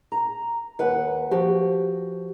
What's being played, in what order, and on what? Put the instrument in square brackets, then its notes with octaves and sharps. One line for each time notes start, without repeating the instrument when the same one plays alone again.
[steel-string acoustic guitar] A#5
D#2 B4 F#5
F3 F#4 G4